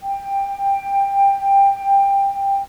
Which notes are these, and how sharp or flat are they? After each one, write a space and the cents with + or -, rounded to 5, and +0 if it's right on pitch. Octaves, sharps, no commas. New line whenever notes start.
G5 +15